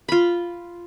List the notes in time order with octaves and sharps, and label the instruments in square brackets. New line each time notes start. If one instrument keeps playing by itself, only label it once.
[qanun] F4 B5